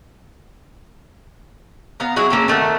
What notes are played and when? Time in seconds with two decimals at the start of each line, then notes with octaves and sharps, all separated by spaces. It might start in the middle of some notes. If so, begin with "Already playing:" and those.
2.00 B3 F5 A#5
2.16 F#3 E4 F#4 G#4
2.30 A#3 C#4 A4
2.48 D#3 A3 A4 F#5